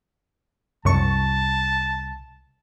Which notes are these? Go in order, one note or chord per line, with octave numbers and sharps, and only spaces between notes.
C2 F#2 A5 C#6